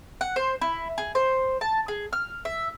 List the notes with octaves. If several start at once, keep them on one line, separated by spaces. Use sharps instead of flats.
F#5
C5
E4
G#4
C5
A5
G#4
F6
E5